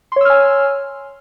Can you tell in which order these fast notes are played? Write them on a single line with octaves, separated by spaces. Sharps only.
C6 C#5 E6 F6 G#5